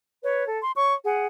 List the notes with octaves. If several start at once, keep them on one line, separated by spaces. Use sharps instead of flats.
B4 C#5
A4
C6
C#5 C#6
G#4 F#5